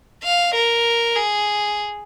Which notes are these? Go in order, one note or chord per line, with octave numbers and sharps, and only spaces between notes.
F5
A#4
G#4